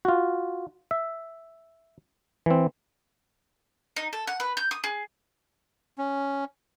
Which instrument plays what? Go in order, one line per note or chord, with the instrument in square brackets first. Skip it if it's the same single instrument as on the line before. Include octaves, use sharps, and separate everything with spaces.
[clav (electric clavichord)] F4 F#4
E5
E3 C4
[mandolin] D#4
A4
F#5
B4
G6
D#6
G#4
[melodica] C#4